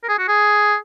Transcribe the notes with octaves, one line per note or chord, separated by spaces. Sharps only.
A#4
G#4
F#4
G#4